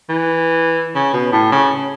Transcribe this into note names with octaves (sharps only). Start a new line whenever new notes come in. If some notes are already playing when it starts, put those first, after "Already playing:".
E3
C#3
B2
A2
C#3